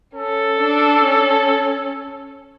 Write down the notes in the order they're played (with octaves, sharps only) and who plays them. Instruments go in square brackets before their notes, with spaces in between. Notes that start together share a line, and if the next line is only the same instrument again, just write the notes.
[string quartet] C#4 [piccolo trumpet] A4
[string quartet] D4
C#4